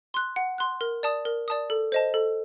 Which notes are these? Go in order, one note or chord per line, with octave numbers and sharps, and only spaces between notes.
C6 F#6
F#5
C6 F#6
A#4
D5 A5 D#6
A#4
D5 A5 D#6
A4
C5 D#5 A5
A4